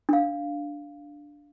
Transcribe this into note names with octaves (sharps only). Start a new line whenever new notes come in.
D4 F5